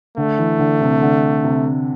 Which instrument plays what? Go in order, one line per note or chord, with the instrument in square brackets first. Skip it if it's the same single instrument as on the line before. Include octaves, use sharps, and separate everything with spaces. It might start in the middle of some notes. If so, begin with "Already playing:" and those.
[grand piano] D3 [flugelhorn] A3
[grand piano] E3
D3
C3
D3
C3